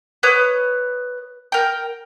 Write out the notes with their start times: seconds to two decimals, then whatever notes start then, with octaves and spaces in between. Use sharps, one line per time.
0.23 B4 C#5 D#6
1.52 A#4 G5